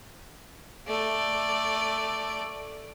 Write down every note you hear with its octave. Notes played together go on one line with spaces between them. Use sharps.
A3 D5